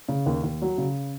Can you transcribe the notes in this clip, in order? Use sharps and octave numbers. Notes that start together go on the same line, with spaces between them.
C#3
D#2
D#2
F#3
C#3